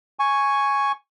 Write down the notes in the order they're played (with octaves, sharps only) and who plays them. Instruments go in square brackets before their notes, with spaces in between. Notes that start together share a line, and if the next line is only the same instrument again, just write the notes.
[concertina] G#5 C#6